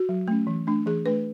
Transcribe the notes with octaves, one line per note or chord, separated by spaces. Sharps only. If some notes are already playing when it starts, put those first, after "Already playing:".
Already playing: F#4
F#3
A3 C#4
E3
A3 D4
E3 G#4
A3 D4 B4